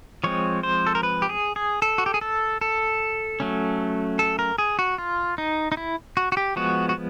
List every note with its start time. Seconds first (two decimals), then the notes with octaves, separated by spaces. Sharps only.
0.24 F3 G#3 C4 C#5
0.63 C5
0.87 A4
0.95 A#4
1.03 B4
1.22 G4
1.29 G#4
1.56 G#4
1.82 A4
1.98 F#4
2.06 G4
2.14 G#4
2.21 A4
2.61 A4
3.40 F#3 A3 C#4
4.19 A4
4.39 A#4
4.58 G#4
4.79 F#4
4.98 F4
5.38 D#4
5.72 D#4
5.77 E4
6.17 F#4
6.32 F#4
6.37 G4
6.56 F3 G#3 B3 F#4
6.89 F#4